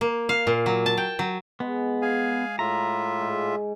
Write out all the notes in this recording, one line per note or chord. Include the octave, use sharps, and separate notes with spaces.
A#3
F5
A#2
F#3
A5
G5
F#3
G#3 B3
G#4 F5 G#5
A2 F4 E5 A#5
G#2